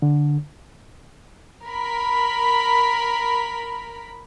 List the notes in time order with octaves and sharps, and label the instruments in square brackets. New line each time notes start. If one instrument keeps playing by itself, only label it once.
[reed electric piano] D3
[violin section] A#4 B5